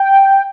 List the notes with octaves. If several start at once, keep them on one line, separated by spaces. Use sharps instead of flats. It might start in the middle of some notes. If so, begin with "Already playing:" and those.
Already playing: G5